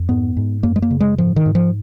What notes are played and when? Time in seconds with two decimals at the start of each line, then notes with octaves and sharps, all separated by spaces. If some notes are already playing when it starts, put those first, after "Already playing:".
Already playing: F2
0.09 G#2 B3
0.37 G#2
0.63 F#2 A#3
0.76 G#3
0.82 A#3
0.91 C#3
1.00 G#3
1.18 G#2 F3
1.36 D#3
1.46 G#2
1.55 F3